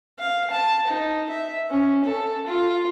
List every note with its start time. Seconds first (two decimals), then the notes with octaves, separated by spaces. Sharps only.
0.19 F5
0.51 A5
0.87 D#4
1.30 E5
1.70 C#4
2.04 A4
2.47 F4